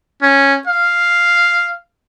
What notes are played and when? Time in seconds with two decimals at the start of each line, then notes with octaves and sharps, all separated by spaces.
0.22 C#4
0.67 F5